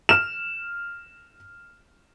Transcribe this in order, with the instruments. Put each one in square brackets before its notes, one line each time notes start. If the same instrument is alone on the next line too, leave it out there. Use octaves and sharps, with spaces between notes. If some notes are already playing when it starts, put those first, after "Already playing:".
[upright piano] F6 E7